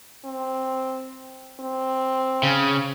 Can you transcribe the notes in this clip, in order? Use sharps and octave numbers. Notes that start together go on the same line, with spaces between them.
C4
C4
C#3